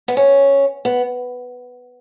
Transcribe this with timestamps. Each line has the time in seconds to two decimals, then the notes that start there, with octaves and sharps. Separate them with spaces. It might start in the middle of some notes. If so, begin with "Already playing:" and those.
0.08 B3
0.17 C#4
0.85 B3